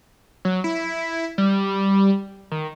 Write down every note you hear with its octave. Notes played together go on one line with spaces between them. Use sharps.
F#3
E4
G3
D#3